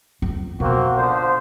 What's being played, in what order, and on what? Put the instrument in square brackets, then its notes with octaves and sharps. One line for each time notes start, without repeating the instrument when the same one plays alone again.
[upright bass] F2
[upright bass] B2 [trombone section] A#3 C4 F#4
[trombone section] D3 F3 C5